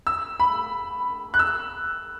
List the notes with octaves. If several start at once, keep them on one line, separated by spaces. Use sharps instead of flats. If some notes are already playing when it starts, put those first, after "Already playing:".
E6
B5
F#6
E6